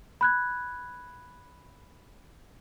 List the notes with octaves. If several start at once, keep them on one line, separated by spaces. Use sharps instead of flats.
B5 F#6 G#6